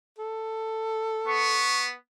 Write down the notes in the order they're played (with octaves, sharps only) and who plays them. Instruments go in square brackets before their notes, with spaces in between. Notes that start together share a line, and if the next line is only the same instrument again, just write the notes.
[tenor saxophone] A4
[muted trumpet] B3 [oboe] C#6